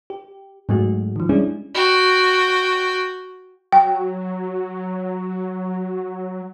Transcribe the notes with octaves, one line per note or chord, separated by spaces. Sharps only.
G4
G#2 F#3 G#3 A3 F#4
D#3 F3
G3 G#3 C#4 D4 E4 G#4
F#4 G5
F#3 G5